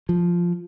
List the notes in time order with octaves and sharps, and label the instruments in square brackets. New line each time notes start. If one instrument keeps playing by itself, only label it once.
[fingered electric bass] F3